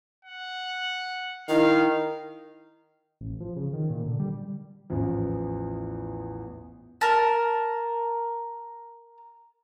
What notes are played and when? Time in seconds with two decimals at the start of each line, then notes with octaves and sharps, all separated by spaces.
0.25 F#5
1.49 D#3 E4 F5
3.21 A1
3.40 F3
3.56 C#3
3.73 D#3
3.90 A#2
4.06 D3
4.19 G3
4.90 A1 E2 F3
7.01 A#4 A5